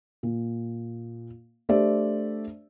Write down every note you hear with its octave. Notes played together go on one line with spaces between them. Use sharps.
A#2
A3 D4 G4 C5 D5 E5